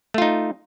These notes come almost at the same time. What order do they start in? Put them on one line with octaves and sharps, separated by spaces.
A3 F4 D#4